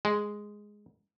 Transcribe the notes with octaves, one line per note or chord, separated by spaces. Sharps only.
G#3